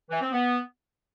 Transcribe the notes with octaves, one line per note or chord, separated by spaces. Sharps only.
E3
C4
B3